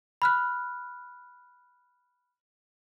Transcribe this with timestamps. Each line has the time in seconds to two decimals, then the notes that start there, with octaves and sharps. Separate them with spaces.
0.22 B5 F6 F#6